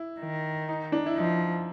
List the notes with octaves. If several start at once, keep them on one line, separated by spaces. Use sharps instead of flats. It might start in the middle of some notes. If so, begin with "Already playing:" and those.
Already playing: E4
D#3
D#4
D4
E4
F3 D#4